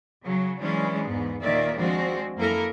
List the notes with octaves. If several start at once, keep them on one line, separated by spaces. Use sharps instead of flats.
C#3 F#3
E3 F#3 G#3 C#4 D4
E2 G#2 B3
D#2 A#2 D#3 A#3 D5 E5
F3 G#3 C4 D4 F#4
F#2 A#3 E4 A4 A#4